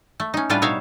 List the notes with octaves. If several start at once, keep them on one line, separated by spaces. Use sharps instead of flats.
A3
C#4 D#4
A2 G3 D4 F4 B4 F5
B2 D#4 C#5 E5 F5